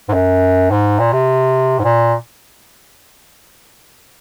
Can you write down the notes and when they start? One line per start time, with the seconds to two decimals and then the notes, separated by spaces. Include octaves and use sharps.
0.09 G#2
0.14 F#2
0.71 G#2
0.99 A#2
1.13 C3
1.79 G#2
1.84 A#2